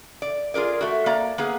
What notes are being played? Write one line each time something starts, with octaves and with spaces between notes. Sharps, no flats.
D5
F4 G#4 A#4 D5
A3 F#4
A#3 D5 A#5
A#3 B3 G#4